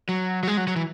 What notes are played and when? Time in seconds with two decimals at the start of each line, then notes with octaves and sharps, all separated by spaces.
0.09 F#3
0.43 F#3
0.48 G#3
0.57 F#3
0.67 F#3
0.76 E3